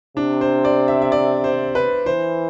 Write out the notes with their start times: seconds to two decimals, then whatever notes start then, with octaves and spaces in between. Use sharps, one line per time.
0.17 C3 D4
0.41 C5
0.65 D5
0.88 E5
1.02 E5
1.12 D5
1.44 C5
1.75 B4
2.06 E3 C5